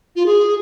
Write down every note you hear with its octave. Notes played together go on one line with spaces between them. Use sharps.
F4
G#4